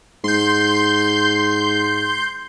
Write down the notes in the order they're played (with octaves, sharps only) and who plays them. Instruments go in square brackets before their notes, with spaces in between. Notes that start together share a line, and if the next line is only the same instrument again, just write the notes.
[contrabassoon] G#2 [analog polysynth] C6 G6